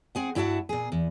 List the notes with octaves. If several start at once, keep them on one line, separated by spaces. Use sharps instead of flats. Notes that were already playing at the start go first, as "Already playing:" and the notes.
C4 G#4 F#5
G2 E4 F#4 E5 F#5 A5
A#2 G#4
E2